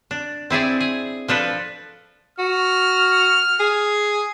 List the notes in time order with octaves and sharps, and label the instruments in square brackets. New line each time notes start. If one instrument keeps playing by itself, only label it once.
[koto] D4
C4 E4 G#4 D5
G#4
F3 D4 A4 B4
[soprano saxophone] F#4 [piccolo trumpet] F6
[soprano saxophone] G#4